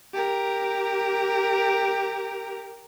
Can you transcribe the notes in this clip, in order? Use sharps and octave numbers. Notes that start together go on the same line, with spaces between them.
G4 A#4